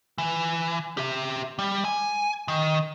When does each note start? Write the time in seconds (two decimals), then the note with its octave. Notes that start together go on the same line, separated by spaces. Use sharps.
0.18 E3
0.97 G4 E5
1.59 G3
1.85 G#5
2.48 D#3